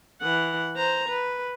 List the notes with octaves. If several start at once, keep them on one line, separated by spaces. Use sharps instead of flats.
E3 F#5
C5 A#5
B4